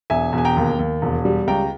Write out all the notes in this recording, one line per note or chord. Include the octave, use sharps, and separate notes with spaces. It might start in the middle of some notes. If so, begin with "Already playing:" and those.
E1 E5 G#5
E1
G#5
G5 A#5
D#2
D#2
E1
G3
C#2 G5 A#5